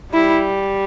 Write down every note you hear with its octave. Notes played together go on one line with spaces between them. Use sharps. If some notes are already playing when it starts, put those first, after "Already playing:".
G3 E4